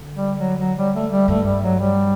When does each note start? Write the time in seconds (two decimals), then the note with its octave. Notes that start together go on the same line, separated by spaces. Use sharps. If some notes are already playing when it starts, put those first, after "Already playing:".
Already playing: D3
0.15 G3
0.38 F#3
0.61 F#3
0.78 G3
0.95 A3
1.12 G3
1.28 G2 A3
1.46 G3
1.63 F#3
1.80 G3